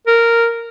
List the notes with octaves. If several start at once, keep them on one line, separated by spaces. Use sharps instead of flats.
A#4